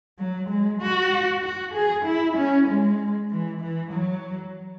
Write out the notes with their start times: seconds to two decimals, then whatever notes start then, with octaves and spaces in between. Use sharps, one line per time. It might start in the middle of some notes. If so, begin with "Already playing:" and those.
0.19 F#3
0.49 G#3
0.81 F#4
1.43 F#4
1.74 G#4
2.05 E4
2.37 C#4
2.67 G#3
3.31 E3
3.61 E3
3.92 F#3